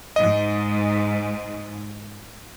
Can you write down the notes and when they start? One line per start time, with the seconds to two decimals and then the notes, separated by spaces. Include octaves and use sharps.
0.16 G#2 D#5